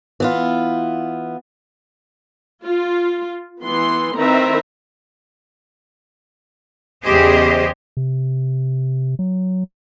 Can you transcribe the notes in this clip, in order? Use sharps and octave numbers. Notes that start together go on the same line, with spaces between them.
E3 B3 F4
F4
E3 B3 C6
D#3 C4 E4 B4 E5 A#5
E2 C#3 G4 G#4 C5 D#5
C3
F#3